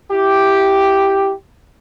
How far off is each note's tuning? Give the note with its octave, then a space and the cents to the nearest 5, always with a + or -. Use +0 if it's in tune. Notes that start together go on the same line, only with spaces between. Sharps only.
E4 +0 G4 +0